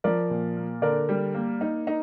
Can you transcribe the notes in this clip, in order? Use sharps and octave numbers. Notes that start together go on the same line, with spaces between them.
F3 A#4 D5
A#2
A#3
D3 A#4 D5
G3
A#3
D#4
D#4